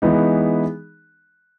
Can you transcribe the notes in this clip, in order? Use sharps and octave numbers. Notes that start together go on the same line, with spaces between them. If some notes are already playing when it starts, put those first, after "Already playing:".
E3 G#3 B3 D#4